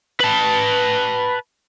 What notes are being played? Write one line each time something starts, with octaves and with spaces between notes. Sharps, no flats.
B4 A5